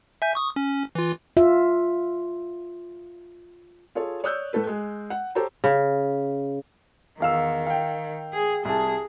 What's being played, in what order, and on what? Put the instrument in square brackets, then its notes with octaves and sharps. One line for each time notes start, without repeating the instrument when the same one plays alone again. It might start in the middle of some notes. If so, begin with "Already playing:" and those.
[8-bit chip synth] E5 G#5 G6
C#6 D#6
C#4
E3 F4
[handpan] F4 E5
[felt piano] F4 G#4 A4 C#5
C#5 D5 D#6 E6 F#6 G6
A2 A3 A4 B4
G#3 G#4
F#5
G4 A4 C5 C#5 A#5
[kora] C#3
[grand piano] E2 F5 E6 [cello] D#3
[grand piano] F5 G5
[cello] G#4
[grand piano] C2 A5 [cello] G#4